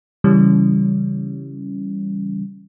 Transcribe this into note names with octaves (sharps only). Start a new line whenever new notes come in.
C#3 E3 G3 C#4